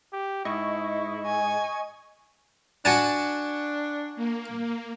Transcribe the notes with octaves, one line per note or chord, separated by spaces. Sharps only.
G4
G#2 E4 D#5 C#6
G#5
D4 F#4 G#5 A5
A#3